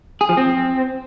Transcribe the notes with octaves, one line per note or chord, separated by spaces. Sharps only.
G#4
F3
C4